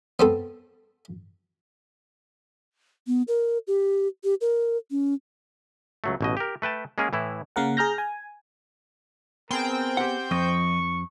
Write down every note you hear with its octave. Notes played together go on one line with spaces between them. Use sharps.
B3 C4 A4
B3
A#4
G4
G4
A#4
C#4
C#2 F#3 A3
A1 B2 D#5
G4 A#4
A3 B4 G5 A5
G#3 A#3 C#4 G#4 A#4
A2 E3 E4
C#3 A#3 A#4 F#5
G#4 A#5 F6 G6 A#6
G#5
B3 C4 G#4 A#4 G5
G4 F#5
F2 F3 D#5 C#6